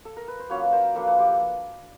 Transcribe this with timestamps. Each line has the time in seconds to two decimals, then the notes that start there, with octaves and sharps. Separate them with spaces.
0.05 A4
0.17 A#4
0.28 B4
0.39 C5
0.49 F#3 A#3 C#4 F4 B4 C#5
0.63 B4
0.72 A#4 C5
0.95 F3 A#3 D4 F4 A4 B4
1.07 A4 B4
1.18 F4 G4